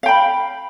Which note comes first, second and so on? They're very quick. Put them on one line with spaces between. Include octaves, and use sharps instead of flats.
F5 G5 B5